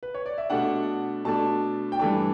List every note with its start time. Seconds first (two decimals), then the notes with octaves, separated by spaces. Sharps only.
0.03 B4
0.15 C#5
0.26 D5
0.38 E5
0.50 B2 A3 D4 F#5
1.25 B2 A3 D4 A5
1.92 G5
1.99 G2 E3 A3 D4 A5